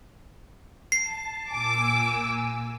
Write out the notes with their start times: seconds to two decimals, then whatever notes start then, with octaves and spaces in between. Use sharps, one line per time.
0.92 A5 C7
1.50 A#2 G#5 D6 E6